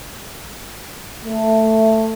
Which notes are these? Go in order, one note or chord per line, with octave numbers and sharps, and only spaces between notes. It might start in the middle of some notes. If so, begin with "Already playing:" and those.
A3